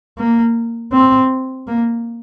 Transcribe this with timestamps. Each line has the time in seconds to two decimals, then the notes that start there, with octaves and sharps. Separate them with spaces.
0.18 A#3
0.93 C4
1.68 A#3